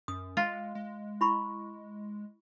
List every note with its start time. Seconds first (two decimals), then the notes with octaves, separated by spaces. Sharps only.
0.08 F#2 D#6
0.37 G#3 F4
0.75 G#3
1.21 E4 B5 C#6